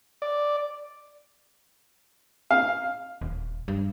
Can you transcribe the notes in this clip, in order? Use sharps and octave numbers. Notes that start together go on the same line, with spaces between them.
D5
F5
D#1
G2